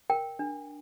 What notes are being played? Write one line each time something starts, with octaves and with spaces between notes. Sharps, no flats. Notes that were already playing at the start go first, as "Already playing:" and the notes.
A#4 G5
D4